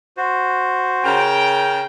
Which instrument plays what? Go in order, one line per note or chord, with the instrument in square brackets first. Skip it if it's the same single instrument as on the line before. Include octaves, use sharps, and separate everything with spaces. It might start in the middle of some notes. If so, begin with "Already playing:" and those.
[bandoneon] F#4 C5
[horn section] C#3 A#4 G5